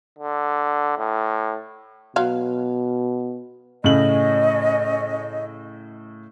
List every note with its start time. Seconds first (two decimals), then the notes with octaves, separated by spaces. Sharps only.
0.19 D3
0.98 A2
2.16 B2 F#3 F5
3.84 A2 C#3 C#4 D#5 F#7